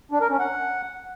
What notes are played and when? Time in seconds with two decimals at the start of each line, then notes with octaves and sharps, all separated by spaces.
0.12 D4
0.21 A#4
0.30 C#4
0.39 F#5